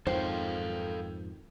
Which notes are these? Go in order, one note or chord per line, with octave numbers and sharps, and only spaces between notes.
F2 G#2 D#3 A4 C5 F5 G5